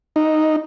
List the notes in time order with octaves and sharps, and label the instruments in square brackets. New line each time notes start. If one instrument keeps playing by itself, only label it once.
[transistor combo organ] D#4